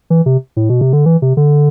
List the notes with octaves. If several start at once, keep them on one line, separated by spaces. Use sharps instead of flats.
E3
C3
A2
B2
C3
D3
E3
C3
D3